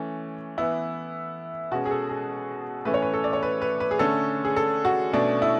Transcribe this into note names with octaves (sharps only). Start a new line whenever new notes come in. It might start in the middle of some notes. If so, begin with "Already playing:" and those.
Already playing: E3 A3 C#4
E3 B3 E4
B2 G#3 C#4 F#4
G#4
A4
G#4
A2 E3 A3 C#4 B4
C#5
B4
A4
D5
C#5
B4
B4
B4
G#4
D3 A3 C#4 A4
G#4
A4
F#4
B2 A3 C#4 D4
E4